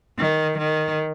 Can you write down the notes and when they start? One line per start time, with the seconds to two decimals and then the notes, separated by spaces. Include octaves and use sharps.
0.19 D#3
0.58 D#3